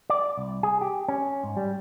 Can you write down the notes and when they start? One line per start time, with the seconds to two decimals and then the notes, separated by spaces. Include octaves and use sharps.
0.10 D5
0.37 C2
0.63 G#4
0.81 G4
1.08 C#4
1.43 G#2
1.57 G3